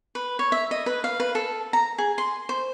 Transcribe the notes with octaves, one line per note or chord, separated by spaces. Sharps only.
B4
C#5
E5
D#5
B4
F5
B4
A4
A#5
G#4
C6
C5